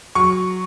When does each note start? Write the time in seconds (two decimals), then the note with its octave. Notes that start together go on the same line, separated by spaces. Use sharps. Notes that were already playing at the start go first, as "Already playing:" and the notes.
0.15 F#3 C#6